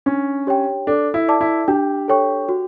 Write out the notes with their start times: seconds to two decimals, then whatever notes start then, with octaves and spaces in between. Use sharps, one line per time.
0.06 C#4 D4
0.47 G4 C#5 G5
0.87 D4 A4
1.14 E4
1.28 D5 A5 D6
1.41 E4
1.68 D4 G4
2.08 A4 C#5 G5 C#6
2.49 F#4